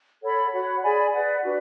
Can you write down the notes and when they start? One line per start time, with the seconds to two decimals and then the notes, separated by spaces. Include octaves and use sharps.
0.22 A4 C#5 F#5 B5
0.52 F#4 C#5 F#5 B5
0.82 G#4 D5 G#5 B5
1.12 G#4 B4 D5 F#5
1.43 D4 F#4 B4